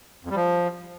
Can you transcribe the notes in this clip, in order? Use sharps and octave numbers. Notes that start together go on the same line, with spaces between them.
F2
G3
F3